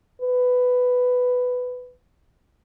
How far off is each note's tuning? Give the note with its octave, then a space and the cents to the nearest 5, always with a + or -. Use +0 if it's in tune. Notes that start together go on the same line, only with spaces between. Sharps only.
B4 +10